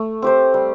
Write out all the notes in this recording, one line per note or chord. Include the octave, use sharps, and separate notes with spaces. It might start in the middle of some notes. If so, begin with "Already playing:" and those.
Already playing: A3
C4 G4 C5
G3